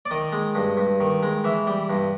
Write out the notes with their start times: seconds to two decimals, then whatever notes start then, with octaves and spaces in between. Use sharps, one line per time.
0.05 D5
0.11 D#3 D#5
0.32 G#3
0.55 G2
0.77 G2
1.00 D#3
1.23 G#3
1.44 E3 E5
1.67 G3
1.89 G2